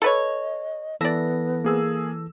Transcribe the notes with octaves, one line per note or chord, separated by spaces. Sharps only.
A4 B4 C#5 D#5
E3 B3 A4 D5 E5 A#6
A#3 G#4 E6